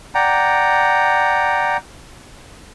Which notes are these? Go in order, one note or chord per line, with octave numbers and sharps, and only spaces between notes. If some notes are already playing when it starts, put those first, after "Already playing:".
D5 F#5 G5 A#5